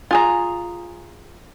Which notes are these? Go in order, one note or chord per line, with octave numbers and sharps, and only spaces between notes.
F4 G#4 A#5